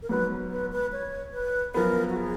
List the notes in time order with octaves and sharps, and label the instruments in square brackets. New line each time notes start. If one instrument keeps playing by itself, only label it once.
[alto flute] A#4
[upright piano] G#2 F#3 B3 [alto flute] B4
[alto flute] B4
B4
C#5
B4
[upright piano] F#2 F3 B3 [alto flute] A#4
[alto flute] F#4
G#4